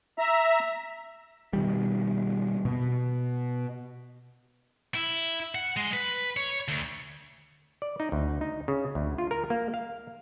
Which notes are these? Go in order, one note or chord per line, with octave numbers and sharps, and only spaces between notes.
E5 A#5
B2 D#3 G3
B2 B3
E4
F#5
G#3
B4
C#5
D2
D5
D#4
D2
D#4
C#3
D2
F4
A#4
A#3
F5